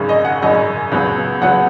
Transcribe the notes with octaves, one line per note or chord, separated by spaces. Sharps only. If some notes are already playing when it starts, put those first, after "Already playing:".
Already playing: G#1 F#2 C#3
D#5
F#5
G#1 F#2 C#3 D#5
C#2 C#3 F#3 B3
C#2 C#3 F#3 B3 F#5